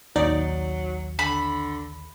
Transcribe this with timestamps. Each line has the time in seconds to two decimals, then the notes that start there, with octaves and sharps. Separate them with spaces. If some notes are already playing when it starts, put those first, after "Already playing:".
0.16 A#1 D#2 F#3 D#4 D5
1.19 D3 B5